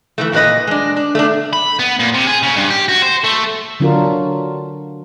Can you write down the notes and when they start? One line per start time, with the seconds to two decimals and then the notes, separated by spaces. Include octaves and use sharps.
0.18 E3 F3 A3
0.32 F2 A#2 C4 B4 D#5
0.67 G#3 D4
0.96 D4
1.15 A3 B3 D4
1.53 B5
1.79 B3
1.99 A#2
2.14 C3
2.27 G#4
2.42 C#3
2.56 G2
2.70 G4
2.88 F#4
3.02 C5
3.24 A3
3.80 D3 F#3 D4 F4 F#4 A#4